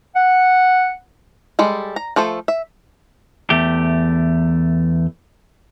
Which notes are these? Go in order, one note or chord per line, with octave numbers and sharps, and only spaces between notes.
F#5
G3 G#3 A4
A#5
F3 A3 A4 C5
E5
E2 A3 G4